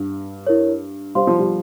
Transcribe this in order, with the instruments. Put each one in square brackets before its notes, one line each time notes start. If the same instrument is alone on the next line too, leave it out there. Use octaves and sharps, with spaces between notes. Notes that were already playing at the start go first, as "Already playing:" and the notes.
Already playing: [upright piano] G2
[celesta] E4 A#4 C#5
[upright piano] G3 [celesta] C5 F5 C6
[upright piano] F3
G3